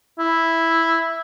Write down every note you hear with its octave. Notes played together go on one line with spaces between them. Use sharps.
E4